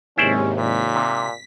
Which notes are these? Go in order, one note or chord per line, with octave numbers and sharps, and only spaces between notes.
D#2 G#2 C3 C#4 E4 C5 D5
A#2 B6
C3